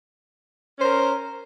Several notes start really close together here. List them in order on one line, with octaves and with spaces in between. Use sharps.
C#4 C5 A#4